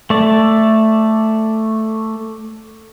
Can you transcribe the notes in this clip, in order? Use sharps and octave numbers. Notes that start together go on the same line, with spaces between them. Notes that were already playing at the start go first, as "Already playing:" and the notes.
A3 D5